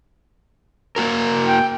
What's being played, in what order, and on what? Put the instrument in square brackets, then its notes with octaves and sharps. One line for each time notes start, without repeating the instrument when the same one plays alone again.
[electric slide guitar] A#3 F#4 A#4
[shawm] G5